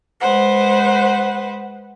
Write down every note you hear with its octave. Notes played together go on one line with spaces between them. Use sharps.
G#3 B4 C5 F#5